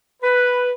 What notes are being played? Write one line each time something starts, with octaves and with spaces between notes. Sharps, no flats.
B4